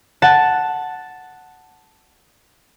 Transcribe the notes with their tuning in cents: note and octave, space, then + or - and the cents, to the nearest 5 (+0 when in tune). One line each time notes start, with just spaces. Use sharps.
F#5 +0 A5 +0